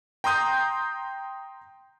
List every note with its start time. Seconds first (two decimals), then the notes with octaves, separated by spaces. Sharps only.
0.24 G5 A#5 C6 D#6 G6